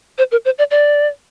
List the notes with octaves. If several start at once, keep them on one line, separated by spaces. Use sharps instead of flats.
C5
A#4
C5
D5
D5